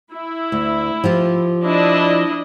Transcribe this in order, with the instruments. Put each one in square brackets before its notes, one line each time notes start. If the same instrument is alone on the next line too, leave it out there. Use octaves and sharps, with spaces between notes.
[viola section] E4
[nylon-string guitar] D2
F3 F4 G4
[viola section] D4 E4 D#5